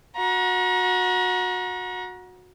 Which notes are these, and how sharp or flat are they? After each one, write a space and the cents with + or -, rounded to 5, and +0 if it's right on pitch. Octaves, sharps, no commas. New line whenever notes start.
F#4 -25 A#5 +35